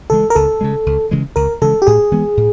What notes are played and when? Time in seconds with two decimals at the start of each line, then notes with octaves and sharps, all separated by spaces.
0.10 C#3 E3 G#3 A4
0.30 A#4
0.35 C#2 A4
0.61 C#3 E3 G#3
0.86 C#2
1.11 C#3 E3 G#3
1.36 C#2 A#4
1.61 C#3 E3 G#3 A4
1.82 G4
1.87 A2 G#4
2.12 E3 G#3 B3
2.37 A2